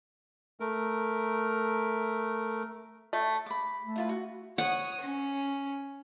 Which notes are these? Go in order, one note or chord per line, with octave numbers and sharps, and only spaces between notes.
A3 A#4
A3
B5 D6
A3
E4 F4 B4
F#4
C#5 F#5 D#6
C#4